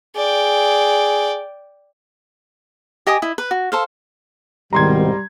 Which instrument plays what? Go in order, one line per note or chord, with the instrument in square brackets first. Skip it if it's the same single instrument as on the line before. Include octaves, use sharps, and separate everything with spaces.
[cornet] G#4 [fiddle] D5 G5
[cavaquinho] G4 D#5 G#5 D#6
E4 D#5
B4
F#4
A4 C5 F5
[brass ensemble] C2 G#2 B2 [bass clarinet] D#3 [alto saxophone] G3 [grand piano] A#5 C6 G#6